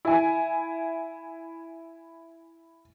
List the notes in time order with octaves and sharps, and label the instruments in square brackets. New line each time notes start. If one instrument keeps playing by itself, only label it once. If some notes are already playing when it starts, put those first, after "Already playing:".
[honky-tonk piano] E4 G#5